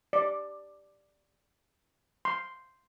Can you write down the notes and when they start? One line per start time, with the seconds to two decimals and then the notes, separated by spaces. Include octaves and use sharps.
0.13 D5
2.25 C6